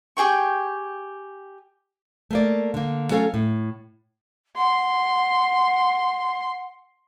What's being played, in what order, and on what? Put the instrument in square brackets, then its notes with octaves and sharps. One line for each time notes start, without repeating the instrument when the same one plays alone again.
[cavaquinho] G4 G#4 G5 C#6
[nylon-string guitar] A3 A#3 D5
D3 A#3
F#3 A3 C#4 A4 E5 F5
A2
[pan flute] F#5 [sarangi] C6